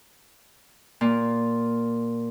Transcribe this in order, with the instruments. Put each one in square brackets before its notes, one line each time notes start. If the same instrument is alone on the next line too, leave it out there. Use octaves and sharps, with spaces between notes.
[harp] A#2